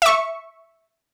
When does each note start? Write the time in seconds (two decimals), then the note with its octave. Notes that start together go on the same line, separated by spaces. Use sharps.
0.02 E5 C#6